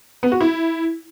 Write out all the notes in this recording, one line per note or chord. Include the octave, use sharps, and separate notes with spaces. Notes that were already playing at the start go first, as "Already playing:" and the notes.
B3
F#4
E4